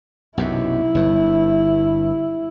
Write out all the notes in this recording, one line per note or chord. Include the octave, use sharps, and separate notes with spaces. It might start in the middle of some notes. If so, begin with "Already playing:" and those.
B1 F#2 C3 E4
G1 G2